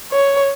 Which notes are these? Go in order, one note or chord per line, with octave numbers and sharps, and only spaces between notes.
C#5